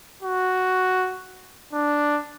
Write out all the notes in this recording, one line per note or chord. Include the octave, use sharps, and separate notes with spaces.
F#4
D4